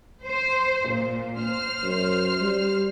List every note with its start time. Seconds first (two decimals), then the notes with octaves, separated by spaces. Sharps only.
0.25 C5
0.88 A#2
1.40 C5 F6
1.83 F#2
2.41 G3